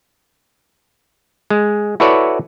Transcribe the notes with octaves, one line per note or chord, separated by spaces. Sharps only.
G#3
E4 F#4 A4 B4 C#5 D5